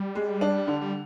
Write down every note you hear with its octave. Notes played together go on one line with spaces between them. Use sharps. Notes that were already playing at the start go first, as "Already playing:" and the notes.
Already playing: G3
G#3
D4
D3
G3